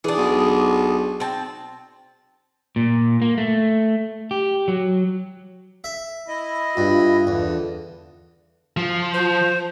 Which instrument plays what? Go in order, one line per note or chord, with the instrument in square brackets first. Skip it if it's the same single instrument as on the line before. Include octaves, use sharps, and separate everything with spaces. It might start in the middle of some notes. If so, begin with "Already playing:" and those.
[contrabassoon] E3 [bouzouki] D4 G#4
[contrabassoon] B1
[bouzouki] C4 A5
[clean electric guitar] A#2
A#3
A3
G4
F#3
[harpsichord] E5
[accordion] E4 D#5
[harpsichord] G2 [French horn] F4
[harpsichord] E2 [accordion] D3
[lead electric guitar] F3
[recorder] C5